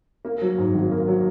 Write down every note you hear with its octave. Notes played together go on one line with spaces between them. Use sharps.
A#3
F#3
G#2
G#1
A#3
F#3